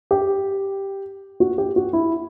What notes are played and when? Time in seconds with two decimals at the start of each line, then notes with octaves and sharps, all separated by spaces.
0.11 G4
1.40 F#4
1.58 G4
1.76 F#4
1.93 E4